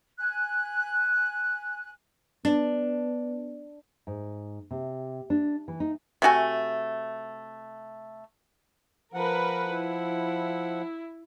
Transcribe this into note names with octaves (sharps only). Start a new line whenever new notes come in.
G#5 F#6
B3 D4
G#2
C3
D4
E3
D#4
C3 A3 F#4 G#5
F3 A#4 B4 F#5
E4